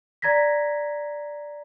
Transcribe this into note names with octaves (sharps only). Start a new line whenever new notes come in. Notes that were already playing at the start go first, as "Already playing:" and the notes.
D5 A#5 G#6 A#6 B6